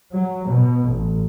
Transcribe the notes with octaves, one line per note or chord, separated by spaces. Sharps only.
F#3
B2
A1